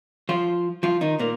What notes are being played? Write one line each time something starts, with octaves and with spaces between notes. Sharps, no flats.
F3 F4
F3 F4
D#3 D#4
A#2 A#3